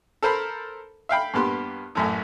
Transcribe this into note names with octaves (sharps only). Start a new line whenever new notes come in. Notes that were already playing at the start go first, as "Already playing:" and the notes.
A4 A#4 C5 A5 B5
E5 F5 G5 B5
G2 A#3 B3 G4 C6
A1 F#2 A2